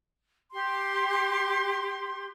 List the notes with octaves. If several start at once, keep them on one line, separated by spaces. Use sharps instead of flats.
G4 C6